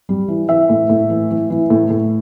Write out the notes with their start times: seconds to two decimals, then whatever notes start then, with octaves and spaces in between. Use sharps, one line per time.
0.09 G3
0.28 E3
0.49 E3 E5
0.69 A2
0.90 A2
1.10 E3
1.31 E3
1.50 E3
1.70 A2
1.90 A2